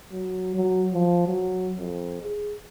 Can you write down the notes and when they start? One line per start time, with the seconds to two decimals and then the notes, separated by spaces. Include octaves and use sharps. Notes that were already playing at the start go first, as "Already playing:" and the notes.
0.12 F#3
0.55 F#3
0.93 F3
1.27 F#3
1.78 F2
2.22 G#4